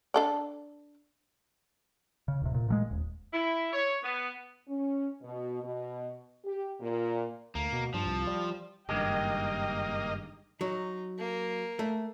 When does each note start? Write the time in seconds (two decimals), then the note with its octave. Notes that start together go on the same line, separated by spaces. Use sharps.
0.14 D4 A4 D5
2.28 C#3
2.42 D1 C3
2.54 A#2
2.69 A#2 F#3 G#3
2.91 D#1
3.33 E4
3.73 C#5
4.03 B3
4.69 C#4
5.22 B2
5.63 B2
6.45 G4
6.80 A#2
7.55 D2 A#3
7.73 B2
7.94 G2 F3
8.06 C2
8.27 G3
8.89 F#1 G2 D#3 G#3 A#3 G4 D#5 G5
10.61 F#3 D#4
11.19 A#3
11.79 A3